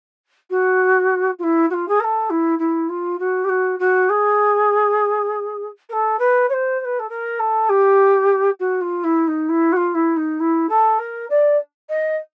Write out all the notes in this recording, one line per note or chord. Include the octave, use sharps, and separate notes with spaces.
F#4
F4
E4
F#4
F4
G#4
A#4
A4
E4
E4
F4
F#4
G4
F#4
F#4
G#4
A#4
A4
B4
C#5
C5
C5
B4
A4
A#4
A4
G4
F#4
F4
E4
D#4
E4
F#4
F4
E4
D#4
E4
A4
A#4
D5
D#5